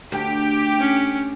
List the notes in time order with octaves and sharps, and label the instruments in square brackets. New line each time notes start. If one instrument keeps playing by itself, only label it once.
[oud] D2 [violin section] G4
[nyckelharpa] C#4